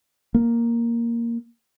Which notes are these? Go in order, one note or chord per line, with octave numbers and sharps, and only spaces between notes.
A#3